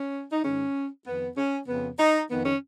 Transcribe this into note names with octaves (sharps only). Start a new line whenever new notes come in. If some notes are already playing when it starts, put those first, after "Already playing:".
Already playing: C#4
D#4
G#2 D#3 C#4
F2 D#3 B3
C#4
F2 C#3 B3
D#4
F2 D#3 B3
C#4